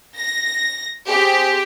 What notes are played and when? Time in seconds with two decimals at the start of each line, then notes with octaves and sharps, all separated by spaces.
0.17 A#6
1.09 C4 G4 G#4